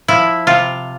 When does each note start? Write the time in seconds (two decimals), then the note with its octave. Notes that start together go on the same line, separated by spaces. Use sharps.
0.08 F3 E4
0.47 C3 F4